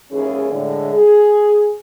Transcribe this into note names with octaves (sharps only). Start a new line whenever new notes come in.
D#2 G#2 E3 C#4 G#4
A2 D3 G#3
G#4